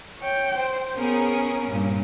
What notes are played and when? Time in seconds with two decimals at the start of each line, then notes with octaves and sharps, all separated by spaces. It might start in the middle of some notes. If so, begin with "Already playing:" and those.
0.19 C#5 G5
0.58 C5
0.97 B3 C#4 G#4 A#4
1.68 G2 A#2